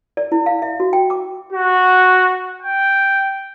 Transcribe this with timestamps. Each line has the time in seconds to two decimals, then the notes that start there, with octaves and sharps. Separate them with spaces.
0.17 D5
0.32 E4
0.46 F5
0.62 E5
0.80 F#4
0.93 G5
1.10 D6
1.52 F#4
2.63 G5